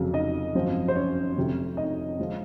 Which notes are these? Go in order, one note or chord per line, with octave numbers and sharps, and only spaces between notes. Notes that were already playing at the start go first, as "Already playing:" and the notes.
Already playing: F1 F2 C#3 F#3
D#4 D#5
G#1 F#2 F3 C4
C5
C#4 C#5
F1 F2 C3
D#4 D#5
F3 G#3